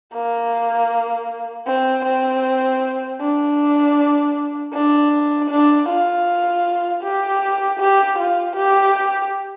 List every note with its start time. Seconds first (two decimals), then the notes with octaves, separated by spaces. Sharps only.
0.14 A#3
1.67 C4
2.05 C4
3.21 D4
4.73 D4
5.50 D4
5.89 F4
7.03 G4
7.80 G4
8.19 F4
8.56 G4